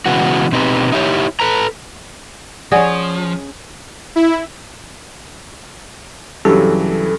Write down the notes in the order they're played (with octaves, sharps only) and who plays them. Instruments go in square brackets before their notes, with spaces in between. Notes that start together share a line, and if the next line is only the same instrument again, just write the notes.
[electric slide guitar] C#3 E3 G#3 B3 F#4
B2 C4 D#4 G4 B4
D#4 E4 G4 C#5
A4 B4 A#5
[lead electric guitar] F3 [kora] C#4 G#4 [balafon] D5 F#5 G#5
[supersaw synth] E4
[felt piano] G2 C#3 [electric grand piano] E3 F#3 [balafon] G4 [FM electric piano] A4